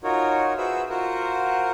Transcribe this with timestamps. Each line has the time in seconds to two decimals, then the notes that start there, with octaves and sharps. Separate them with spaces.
0.04 D#4 F4 F#4 A#4 C#5
0.58 F#4 G#4 B4 C5 E5 E6
0.90 F4 F#4 A#4 C5 F#5